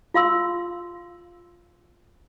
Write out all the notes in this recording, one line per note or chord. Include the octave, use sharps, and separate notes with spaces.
F4 F5 C6 E6